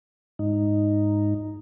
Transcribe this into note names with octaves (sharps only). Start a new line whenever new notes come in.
G#2 D#4